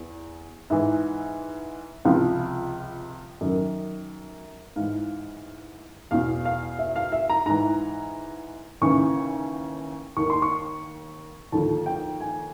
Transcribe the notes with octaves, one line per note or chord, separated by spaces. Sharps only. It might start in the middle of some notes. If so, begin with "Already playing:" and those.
Already playing: E2
G#2 E3 E5
C#2 C3 F3 F5
F#2 D#3
G#2 E3 F5
E2 B2 F5
F5
E5
F5
E5
A#5
G#2 E3 A#5
D#2 C#3 E3 C#6
D#2 D#3 C#6
C6
C#6
D#2 D3 F3 A5
G5
G#5